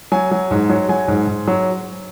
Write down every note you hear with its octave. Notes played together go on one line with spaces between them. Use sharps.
F#3 G#5
F#3
G#2
F#3
F#3 G#5
G#2
G#2
F#3